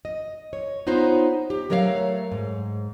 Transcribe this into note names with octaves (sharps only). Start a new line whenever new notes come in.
D#5
C#5
B3 D#4 F4 C5 C#5
G4
F#3 A3 A#4 C#5 E5 F5
G#2